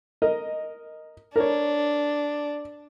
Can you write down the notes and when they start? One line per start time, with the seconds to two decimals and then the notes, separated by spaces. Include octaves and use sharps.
0.22 A#4 D#5
1.36 D4 A#4 C#5